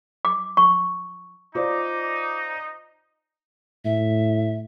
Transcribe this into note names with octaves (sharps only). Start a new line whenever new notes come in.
D6
C#6
D#4 F4 C5 D5 D6
A2 E5